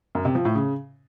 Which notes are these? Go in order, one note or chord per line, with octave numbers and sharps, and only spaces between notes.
F#2
C3
F3
A2
C#3